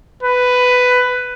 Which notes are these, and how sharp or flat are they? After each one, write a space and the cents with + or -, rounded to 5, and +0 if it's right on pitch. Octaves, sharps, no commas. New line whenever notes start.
B4 +10